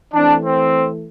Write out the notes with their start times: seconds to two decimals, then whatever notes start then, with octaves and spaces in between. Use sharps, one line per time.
0.14 E3 A3 C4 D4
0.45 C4